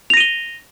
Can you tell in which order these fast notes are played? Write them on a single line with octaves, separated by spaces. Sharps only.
F7 A#6 D#7 G7